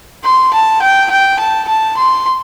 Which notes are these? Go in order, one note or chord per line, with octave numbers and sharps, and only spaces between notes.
C6
A5
G5
G5
A5
A5
C6